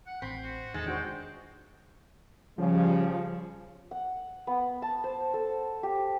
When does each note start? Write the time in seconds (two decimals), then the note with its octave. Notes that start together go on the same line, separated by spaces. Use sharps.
0.07 F#5
0.22 A1 C4 B5
0.43 F#4
0.74 E2 D#3 G#3 D#4 A4
0.86 D4 F#4 C5 G5
2.58 C#3 F3 G3
3.91 F#5
4.47 B3
4.82 A5
5.04 C5
5.34 A4
5.83 G4